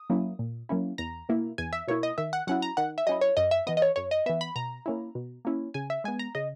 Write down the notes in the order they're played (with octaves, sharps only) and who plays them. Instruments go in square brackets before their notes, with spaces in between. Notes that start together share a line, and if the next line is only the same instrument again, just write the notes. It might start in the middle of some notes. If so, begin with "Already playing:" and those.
Already playing: [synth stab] D#6
F#3 A#3 C#4 E4
A#2
F#3 A#3 C#4 E4
E2 A#5
B2 A#3 E4
E2 G#5
E5
B2 A#3 E4 C#5
D#5
D#3 E5
F#5
F#3 C#4 E4 F#5
A#5
D#3 F#5
E5
F#3 C#4 E4 D#5
C#5
F#2 D#5
E5
E3 B3 D#5
D#5
C#5
F#2 C#5
D#5
E3 B3 E5
B5
B2 A#5
A#3 C#4 E4
B2
A#3 C#4 E4
C#3 G#5
E5
G#3 B3 G#5
A#5
C#3 D#5